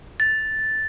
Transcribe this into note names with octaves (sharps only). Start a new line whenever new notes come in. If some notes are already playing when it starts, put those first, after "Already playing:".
A6